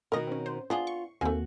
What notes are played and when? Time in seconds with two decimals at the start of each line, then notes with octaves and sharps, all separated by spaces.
0.12 B2 D#3 F#4 A#4 D#5
0.27 C4 C#4
0.46 C5
0.70 B3 D4 F4 G#4
0.87 C#6
1.21 D#2 A3 A#3 C4 F#4 G#5